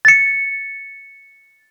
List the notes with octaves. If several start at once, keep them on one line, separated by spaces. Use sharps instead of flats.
A6 C#7